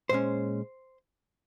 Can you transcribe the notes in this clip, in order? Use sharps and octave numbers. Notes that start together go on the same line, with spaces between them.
A#2 G#3 C#4 C5